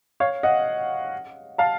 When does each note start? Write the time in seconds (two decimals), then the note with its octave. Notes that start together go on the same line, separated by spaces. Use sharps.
0.20 C#5 F5
0.43 D#5 F#5
1.58 F5 A5